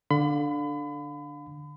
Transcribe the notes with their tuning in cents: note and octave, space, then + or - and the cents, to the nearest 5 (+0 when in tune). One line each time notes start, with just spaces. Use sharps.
D3 +5 F5 +25 B5 +35